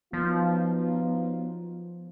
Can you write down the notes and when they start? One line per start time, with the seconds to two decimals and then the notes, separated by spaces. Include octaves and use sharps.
0.13 F3 F#3 B3 D#4 F4